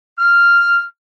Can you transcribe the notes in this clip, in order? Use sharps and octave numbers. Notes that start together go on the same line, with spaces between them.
F6